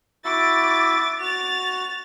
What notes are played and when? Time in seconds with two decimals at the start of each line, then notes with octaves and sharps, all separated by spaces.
0.25 E4 F#4 E5 D6 A6
1.20 F#4 A6 F7